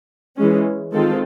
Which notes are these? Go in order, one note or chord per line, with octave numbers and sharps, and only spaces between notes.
E3 G#3 C#4
D#3 G#3 C4 F4 A4